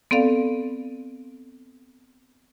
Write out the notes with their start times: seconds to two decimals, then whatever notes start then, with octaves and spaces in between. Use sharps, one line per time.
0.11 B3 C4 A4 D5 F5